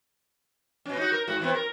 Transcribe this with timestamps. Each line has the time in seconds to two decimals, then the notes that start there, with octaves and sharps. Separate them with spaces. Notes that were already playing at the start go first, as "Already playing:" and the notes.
0.85 B2 C#4
0.97 D#4 F#4
1.12 A#4
1.27 G#2 F#4
1.40 E3 B3 C4
1.55 A#4